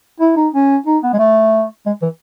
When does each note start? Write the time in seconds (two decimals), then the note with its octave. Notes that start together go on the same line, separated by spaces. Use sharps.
0.20 E4
0.36 D#4
0.53 C#4
0.86 D#4
1.03 B3
1.13 G#3
1.19 A3
1.86 G#3
2.02 E3